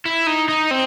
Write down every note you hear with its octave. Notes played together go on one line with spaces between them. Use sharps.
E4
D#4
D#4
C4